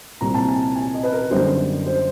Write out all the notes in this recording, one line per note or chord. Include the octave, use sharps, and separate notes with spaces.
C2 A#2 G3 C4 A#5
A5
G#5
G#5
D#5
B4
A#4
F#2 D3 G3 B3 D#4 C5
C5